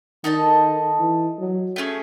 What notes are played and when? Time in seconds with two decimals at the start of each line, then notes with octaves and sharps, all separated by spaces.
0.24 D#3 D#4 A4 D#5 A5
1.00 E3
1.39 F#3
1.76 A3 C#4 G#4